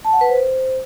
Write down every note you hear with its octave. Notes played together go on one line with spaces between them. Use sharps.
A5
F#5
B4
C5